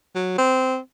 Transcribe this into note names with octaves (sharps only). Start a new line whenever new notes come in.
F#3
C4